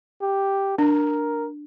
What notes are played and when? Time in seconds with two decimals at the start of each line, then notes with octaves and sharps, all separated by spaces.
0.22 G4
0.78 D4 A#4